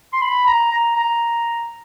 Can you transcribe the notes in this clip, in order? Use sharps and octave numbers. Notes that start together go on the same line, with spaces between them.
C6
B5
A#5
A#5
A#5